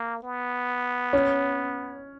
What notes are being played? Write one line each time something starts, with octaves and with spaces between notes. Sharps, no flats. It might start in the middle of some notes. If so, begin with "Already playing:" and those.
Already playing: A#3
B3
C#4